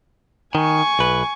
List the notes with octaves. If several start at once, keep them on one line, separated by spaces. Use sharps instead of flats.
D#3 G#5 C#6
B1 B4